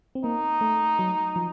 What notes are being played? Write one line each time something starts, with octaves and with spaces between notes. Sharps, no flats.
C4
A#3 D#4
A3
F#3
F3